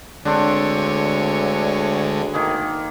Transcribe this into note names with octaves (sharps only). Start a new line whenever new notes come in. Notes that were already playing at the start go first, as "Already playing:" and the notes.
D2 D3 G#3 C4 D4 C#5
D#3 A#3 G#4